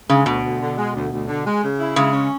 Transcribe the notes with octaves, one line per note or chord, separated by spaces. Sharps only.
C#3 G#3
D2 B2
D2
D3
G#3
D2
D2
D3
G#3
C#3
E4
C#3 G#3
C#4